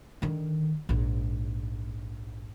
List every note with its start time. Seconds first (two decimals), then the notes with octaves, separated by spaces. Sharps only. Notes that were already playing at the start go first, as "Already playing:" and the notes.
0.22 D3 D#3
0.89 A#1 G#2